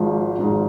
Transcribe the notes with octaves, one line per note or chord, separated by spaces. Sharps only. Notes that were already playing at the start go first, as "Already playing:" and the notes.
Already playing: G#1 G#2 F3
G#1 G#2 F3